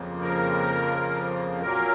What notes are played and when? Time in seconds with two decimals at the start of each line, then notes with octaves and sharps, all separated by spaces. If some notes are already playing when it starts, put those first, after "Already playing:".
Already playing: F2 C#3 F3 A#3
0.22 A#4
1.62 A#2 F#3 A#3 A#4